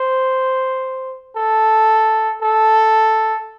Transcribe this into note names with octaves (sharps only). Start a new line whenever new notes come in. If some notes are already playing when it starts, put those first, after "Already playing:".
Already playing: C5
A4
A4